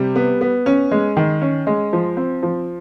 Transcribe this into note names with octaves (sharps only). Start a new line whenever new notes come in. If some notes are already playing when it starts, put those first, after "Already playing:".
Already playing: C3 G3
B3
B3
C#4
G#3
D#3
C#4
G#3
F3
C4
F3